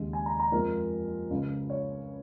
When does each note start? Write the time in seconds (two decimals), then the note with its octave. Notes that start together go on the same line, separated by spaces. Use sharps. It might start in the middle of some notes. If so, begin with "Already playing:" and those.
Already playing: D#2 C#3 G#3
0.13 G#5
0.26 A#5
0.39 A#5
0.52 F2 F3 G#3 A#4
1.30 C#2 C#3 G#3
1.70 C#5